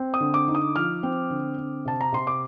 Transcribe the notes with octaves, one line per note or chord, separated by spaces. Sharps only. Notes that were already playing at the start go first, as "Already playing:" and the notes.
Already playing: C4
D#6
D3
D6
D#4
D#6
F3 F6
C4
D3
C4
C3 A5
A#5
C3 C6
D6